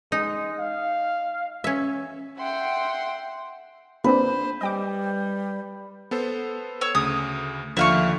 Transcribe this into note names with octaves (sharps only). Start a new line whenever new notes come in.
G#3 D#4
F5
C#4 E5
E5 F#5 G5 C6
A#3 C4 D4 B4 C5
G3 D#5 G5 D6
B3 A4 C5
C#5 E6
D2 C#3 D#6
D#2 D3 F3 E5 F5 C#6